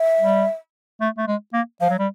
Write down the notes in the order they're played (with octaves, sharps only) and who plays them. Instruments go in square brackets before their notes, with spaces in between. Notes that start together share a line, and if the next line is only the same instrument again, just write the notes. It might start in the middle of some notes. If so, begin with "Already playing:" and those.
Already playing: [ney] E5
[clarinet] G3
A3
A3
G#3
A#3
[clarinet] F3 [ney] F5
[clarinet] F#3
G3